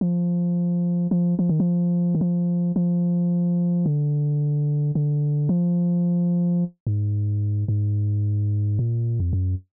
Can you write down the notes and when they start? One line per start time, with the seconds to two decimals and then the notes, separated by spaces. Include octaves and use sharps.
0.01 F3
1.11 F3
1.39 F3
1.49 D#3
1.60 F3
2.15 D#3
2.21 F3
2.76 F3
3.86 D3
4.95 D3
5.49 F3
6.87 G#2
7.68 G#2
8.79 A#2
9.20 F2
9.33 F#2